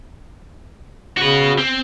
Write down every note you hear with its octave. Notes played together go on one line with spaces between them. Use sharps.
C#3 F#4 B4
C4